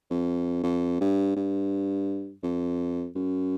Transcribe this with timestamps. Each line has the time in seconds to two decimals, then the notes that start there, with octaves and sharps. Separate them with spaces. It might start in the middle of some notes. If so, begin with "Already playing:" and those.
0.10 F2
0.63 F2
1.00 G2
1.36 G2
2.43 F2
3.15 F#2